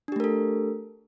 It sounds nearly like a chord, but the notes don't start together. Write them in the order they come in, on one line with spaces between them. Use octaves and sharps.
D4 G4 A3 A#4 A4